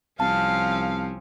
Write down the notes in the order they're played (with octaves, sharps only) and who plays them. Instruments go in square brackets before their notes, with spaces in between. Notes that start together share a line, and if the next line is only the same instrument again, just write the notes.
[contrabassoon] C2 [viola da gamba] F3 C4 C#4 [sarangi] F5 [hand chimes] A5